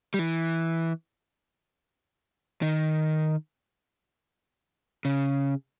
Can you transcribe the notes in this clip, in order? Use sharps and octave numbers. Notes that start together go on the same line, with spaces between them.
G3
E3
D#3
C#3